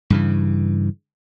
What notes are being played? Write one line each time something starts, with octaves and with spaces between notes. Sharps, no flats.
G2 C#3 E3